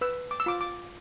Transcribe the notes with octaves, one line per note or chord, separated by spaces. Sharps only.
B4 E6
D6
E6
F4 D6
D6